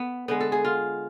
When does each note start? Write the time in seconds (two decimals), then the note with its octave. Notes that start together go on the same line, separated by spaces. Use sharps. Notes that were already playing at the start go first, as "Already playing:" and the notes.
Already playing: B3
0.28 D3 G#3 B3
0.41 A4
0.52 G#4
0.65 F4